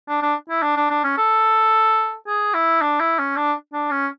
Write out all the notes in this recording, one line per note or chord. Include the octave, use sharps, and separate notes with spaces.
D4
D4
E4
D4
D4
D4
C#4
A4
G#4
E4
D4
E4
C#4
D4
D4
C#4